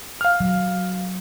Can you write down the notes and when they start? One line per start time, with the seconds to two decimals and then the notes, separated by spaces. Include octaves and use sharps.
0.21 F5 F6
0.40 F#3